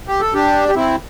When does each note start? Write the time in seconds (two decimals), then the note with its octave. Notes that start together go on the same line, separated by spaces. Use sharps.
0.08 G4
0.21 A4
0.34 D4 G4
0.69 G4
0.75 C4 E4